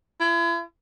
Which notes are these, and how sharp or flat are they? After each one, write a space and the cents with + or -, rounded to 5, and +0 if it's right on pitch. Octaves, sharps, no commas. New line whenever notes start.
E4 +40